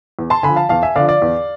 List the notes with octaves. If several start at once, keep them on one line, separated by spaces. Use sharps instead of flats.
E2
A5 C6
D3 F3 G#5 B5
F5 A5
E2 F5 A5
E5 G#5
D3 F3 D5 F5
D5 F5
E2